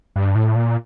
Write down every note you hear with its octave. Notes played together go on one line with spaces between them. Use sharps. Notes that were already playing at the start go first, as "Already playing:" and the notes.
G2
A2
A#2